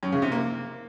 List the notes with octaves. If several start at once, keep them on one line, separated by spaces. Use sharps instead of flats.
F#2
C#3
C3
A#3